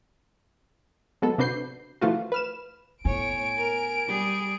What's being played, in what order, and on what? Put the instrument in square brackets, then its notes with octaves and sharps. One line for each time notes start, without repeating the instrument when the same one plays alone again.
[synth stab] F#3 G#3 B3 A4
C3 D4 F#4 B4 G6 C7
E3 F3 A3 F4 F#4
B4 F6 E7
[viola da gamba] A2 C#5 [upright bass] B3 [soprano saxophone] G#5 [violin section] D7
[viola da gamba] A#4
G3 G#4